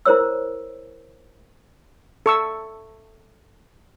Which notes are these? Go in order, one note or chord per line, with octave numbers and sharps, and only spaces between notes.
E4 A#4 C5 C#5 E6
A4 C#6 E6